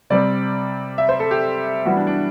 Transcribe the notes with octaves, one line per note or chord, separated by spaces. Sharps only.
C3 G3 C4 D5
E5
C5
A4
G4
E3 G3 B3 F#4
D4
D4